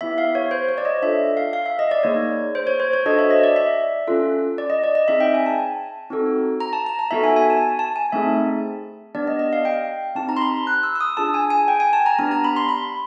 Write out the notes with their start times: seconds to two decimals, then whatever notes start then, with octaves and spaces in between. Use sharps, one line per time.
0.01 B3 E4 G4 E5
0.18 F5
0.35 C#5
0.51 C5
0.69 C#5
0.78 D5
0.85 D#5
1.02 D4 F4 A4 E5
1.37 F5
1.53 F5
1.66 E5
1.79 D#5
1.91 D5
2.03 A#3 D#4 G#4 C#5
2.55 C5
2.67 C#5
2.80 C5
2.93 C#5
3.05 D4 F#4 A4 D#5
3.19 E5
3.30 D#5
3.43 D5
3.56 E5
4.07 C#4 F4 A4
4.58 D5
4.70 D#5
4.84 D5
4.95 D#5
5.08 C4 D#4 G#4 E5
5.20 G5
5.34 G#5
5.46 A5
6.10 C4 D#4 F#4 A4
6.60 A#5
6.73 A5
6.86 A#5
6.99 A5
7.11 B3 D#4 F#4 A4 E5
7.24 G#5
7.36 G#5
7.50 A5
7.79 A5
7.96 G#5
8.12 A3 C4 D#4 G#4 E5
9.15 B3 D4 G4 D5
9.27 D#5
9.39 D#5
9.53 F5
9.65 G5
10.15 C4 D#4 G4 A5
10.29 A#5
10.37 C6
10.42 B5
10.67 F#6
10.83 E6
10.96 E6
11.01 D#6
11.17 D4 F4 G#4 A5
11.34 G#5
11.50 G#5
11.68 G5
11.80 G#5
11.93 A5
12.06 A#5
12.19 B3 D4 G4 A#5
12.31 A#5
12.44 B5
12.56 C6
12.69 B5